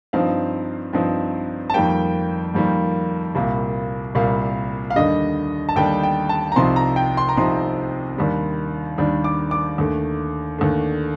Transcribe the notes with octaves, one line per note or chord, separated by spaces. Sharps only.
G2 F3 C4 D#4 F5
G2 F3 C4 D#4
A5
F2 D#3 G3 A#3 G5
F2 D#3 G3 A#3
C2 A#2 G3 A#3
C2 A#2 G3 A#3 F5
F5
D#2 D3 G3 D4 D#5
A5
D#2 D3 G3 D4 G5
G5
A5
A#5
C2 C3 F3 C4 D#4 C6
A#5
G5
C6
A#5
C2 C3 F3 C4 D#4 C6
D#2 D#3 G3 D4
D#2 D#3 G3 D4
D6
D6
D#2 D3 A3
D#2 D3 A3